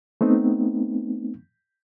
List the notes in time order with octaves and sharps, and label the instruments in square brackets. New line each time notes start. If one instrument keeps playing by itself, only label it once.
[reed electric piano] A3 B3 C4 D#4